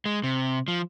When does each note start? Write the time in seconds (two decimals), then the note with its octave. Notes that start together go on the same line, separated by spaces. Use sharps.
0.06 G#3
0.24 C3
0.68 F3